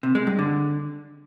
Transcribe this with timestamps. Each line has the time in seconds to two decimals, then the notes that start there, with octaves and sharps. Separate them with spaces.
0.03 C3
0.15 G#3
0.27 G2
0.39 D3